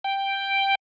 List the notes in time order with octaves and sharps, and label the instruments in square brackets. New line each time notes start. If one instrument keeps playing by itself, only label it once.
[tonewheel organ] G5